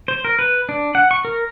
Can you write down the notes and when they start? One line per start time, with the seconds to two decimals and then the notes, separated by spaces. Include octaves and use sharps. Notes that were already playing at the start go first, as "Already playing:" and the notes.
0.08 C5
0.25 A#4
0.39 B4
0.69 D4
0.95 F#5
1.11 C#6
1.25 A#4